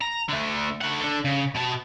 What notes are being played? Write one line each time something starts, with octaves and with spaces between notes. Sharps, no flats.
A#5
D3 A3
A3 F#5
D4 A4
C#3
B2 A5